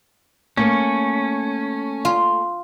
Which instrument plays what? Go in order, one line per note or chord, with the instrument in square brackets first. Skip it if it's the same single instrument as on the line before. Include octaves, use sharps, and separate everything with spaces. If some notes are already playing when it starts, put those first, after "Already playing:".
[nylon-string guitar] A3 A#3 [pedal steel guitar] C#4
[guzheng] F4